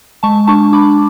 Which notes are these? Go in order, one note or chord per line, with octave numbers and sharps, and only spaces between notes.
G#3 A5 C#6
D4 A5 C#6
D4 B5 D6